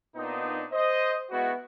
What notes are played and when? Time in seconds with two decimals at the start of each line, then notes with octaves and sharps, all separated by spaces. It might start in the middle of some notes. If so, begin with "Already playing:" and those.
0.16 A#2 B3 C4 D4 D#4
0.72 C5 D#5
1.31 G#3 B3 E4 F#4